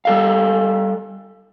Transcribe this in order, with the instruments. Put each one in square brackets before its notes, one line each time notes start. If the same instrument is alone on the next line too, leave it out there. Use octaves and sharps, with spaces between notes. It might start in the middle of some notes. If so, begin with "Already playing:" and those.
[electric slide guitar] G3 A4 F5